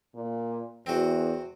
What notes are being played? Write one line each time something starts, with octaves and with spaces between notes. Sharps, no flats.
A#2
E2 C4 F#4